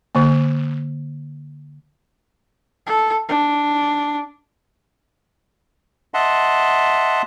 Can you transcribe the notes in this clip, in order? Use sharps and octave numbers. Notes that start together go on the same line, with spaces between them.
D3 A#3
A4
D4
D#5 E5 F#5 A5 C6